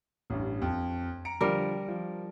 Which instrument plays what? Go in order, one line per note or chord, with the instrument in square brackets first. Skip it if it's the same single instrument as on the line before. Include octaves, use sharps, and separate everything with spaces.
[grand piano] A1 G2
F2
A#5 C#7 D7
[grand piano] D3 F3 [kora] G3 A#4
[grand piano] F3